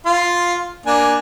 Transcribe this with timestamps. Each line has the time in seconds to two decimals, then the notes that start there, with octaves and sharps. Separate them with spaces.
0.06 F4 F5 C6
0.86 A#3 D4 G#5